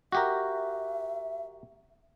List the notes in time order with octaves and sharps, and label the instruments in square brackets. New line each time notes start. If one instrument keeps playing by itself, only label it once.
[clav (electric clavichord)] F#4 G4 A#4 [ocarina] E5